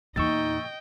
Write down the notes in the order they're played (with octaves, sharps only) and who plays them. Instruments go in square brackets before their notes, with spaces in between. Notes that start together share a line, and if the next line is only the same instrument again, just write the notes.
[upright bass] E2 A#2 [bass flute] D#4 [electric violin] D#5 G5 [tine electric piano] C#6 E6 A6